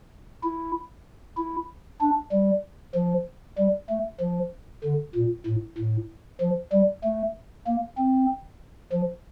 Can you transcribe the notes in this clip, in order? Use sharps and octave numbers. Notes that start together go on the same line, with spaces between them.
E4
E4
D4
G3
F3
G3
A3
F3
D3
A#2
A2
A2
F3
G3
A3
A#3
C4
F3